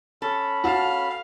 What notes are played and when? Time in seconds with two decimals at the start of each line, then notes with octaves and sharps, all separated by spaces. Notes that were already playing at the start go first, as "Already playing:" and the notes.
0.22 C#4 A4 B5
0.64 F#4 F5 A5